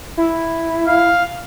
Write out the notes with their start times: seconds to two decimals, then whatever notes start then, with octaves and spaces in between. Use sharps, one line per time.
0.17 E4
0.87 F5